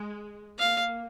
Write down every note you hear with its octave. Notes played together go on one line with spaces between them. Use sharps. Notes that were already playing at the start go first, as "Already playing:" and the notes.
Already playing: G#3
A#3 F5